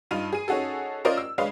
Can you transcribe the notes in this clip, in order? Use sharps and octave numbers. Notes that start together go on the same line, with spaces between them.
G2 D#4 F4 D#7
G#4 D#7
C#4 D#4 F#4 G#4 A4
C#4 F4 A#4 C5 D5 D#5
E6
G#3 D4 B4 C#5 D#5 F5